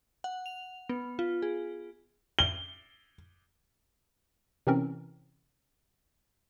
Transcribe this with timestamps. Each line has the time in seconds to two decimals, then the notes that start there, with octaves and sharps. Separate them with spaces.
0.24 F#5
0.46 F7
0.89 B3
1.19 F4
1.42 G#4
2.39 G7
4.67 C3 E3 C4 C#4 A#4